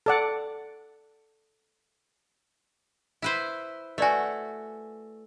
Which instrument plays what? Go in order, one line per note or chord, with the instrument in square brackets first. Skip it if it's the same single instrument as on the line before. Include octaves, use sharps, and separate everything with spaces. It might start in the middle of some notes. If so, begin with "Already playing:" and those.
[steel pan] A4 D5 F#5
[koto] E4 B4 C5
[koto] A3 F#4 [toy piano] B4 D5 G#5